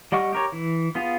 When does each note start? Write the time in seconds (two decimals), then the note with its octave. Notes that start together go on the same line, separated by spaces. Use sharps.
0.12 G3 D#5 F#5 C#6 F6
0.33 G4 A#4 C#5
0.52 E3
0.95 B3 F4 G#4 F5